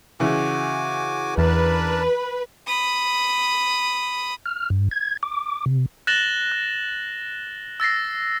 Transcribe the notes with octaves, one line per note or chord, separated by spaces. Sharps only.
C#3 E3 F#4 G#5 D6
E2 D4 A#4 B4 A5
B5 D#6
F6
G2
G#6
D6
C3
F#6 A6 A#6 E7 F#7 G7
F#6
E6 A6 A#6 C7